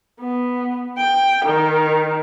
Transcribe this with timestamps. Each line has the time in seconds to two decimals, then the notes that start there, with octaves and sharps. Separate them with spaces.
0.20 B3
0.97 G5
1.45 D#3